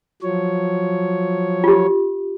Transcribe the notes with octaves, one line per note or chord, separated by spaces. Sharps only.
F3 F#3 C#5
F4 G4